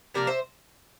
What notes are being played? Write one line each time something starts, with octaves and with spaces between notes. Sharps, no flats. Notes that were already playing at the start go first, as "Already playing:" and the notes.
C3 F3 A#3 A#4 D5
C5 E5